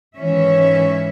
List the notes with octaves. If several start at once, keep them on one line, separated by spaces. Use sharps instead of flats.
G#2 D#3 E3 C#4 C#5 E5